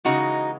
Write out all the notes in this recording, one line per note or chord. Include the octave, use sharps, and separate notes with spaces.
C#3 E3 G#3 D#4 F#4